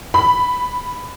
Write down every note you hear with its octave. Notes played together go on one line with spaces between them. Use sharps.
B5